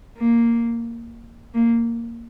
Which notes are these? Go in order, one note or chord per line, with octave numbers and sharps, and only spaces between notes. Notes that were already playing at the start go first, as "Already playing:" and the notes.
A#3
A#3